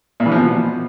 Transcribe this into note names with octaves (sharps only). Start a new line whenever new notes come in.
A#2
E3
F3
B2